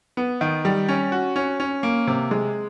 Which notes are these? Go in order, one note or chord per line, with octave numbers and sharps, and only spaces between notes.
B3
D#3
G3
C#4
F#4
C#4
C#4
A#3
C3
G#3